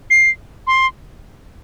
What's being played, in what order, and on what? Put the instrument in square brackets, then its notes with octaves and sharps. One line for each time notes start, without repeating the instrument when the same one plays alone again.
[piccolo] C7
C6